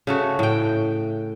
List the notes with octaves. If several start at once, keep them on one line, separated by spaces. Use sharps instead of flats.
C#3 A3 F#4
A2 G5